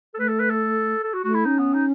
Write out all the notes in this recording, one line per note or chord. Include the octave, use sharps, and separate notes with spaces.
A4
A3 B4
A4
B4
A4
A4
F#4
A3 F#4
E4
C#4 D#4
B3
D#4